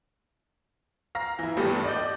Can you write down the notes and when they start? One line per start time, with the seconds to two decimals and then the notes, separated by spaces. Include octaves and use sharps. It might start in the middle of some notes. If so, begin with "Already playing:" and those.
1.15 F5 A#5 A#6
1.39 E3 E4
1.57 G#1 G2 A3 B3 G4 A4
1.84 D5 D#5 D#6 G6